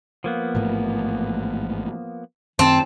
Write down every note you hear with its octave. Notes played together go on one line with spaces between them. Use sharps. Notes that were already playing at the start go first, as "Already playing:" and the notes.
F3 A#3 B3
A1 G#2 A3
F#2 D#3 C4 A5